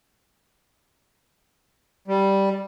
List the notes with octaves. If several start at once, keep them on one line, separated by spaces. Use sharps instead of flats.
G3